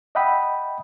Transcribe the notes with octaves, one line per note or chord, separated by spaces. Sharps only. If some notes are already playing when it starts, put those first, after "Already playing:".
D#5 E5 F#5 G5 B5 D#6